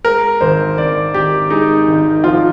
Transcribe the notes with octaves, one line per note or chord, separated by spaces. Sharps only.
G#3 A#4
G#1 C5
G#1 D5
G#1 G4
G#3 D#4
G#1
F3 F4